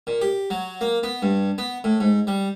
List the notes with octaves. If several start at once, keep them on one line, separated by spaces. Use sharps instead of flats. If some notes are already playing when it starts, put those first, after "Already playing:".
A#2
G4
F#3
A#3
B3
G2
B3
A2
G#2
G3